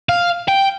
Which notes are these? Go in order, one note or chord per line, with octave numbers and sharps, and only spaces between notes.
F5
G5